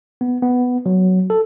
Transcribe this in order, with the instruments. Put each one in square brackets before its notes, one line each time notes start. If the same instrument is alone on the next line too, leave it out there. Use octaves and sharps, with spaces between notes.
[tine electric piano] B3
B3
F#3
A4